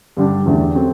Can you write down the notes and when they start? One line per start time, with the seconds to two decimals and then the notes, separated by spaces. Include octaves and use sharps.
0.17 G2 D3 G3 D4
0.46 E2 D3 A3 E4 G4
0.74 F#3 C4 F#4 A4